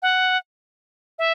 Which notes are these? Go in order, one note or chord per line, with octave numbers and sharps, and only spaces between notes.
F#5
E5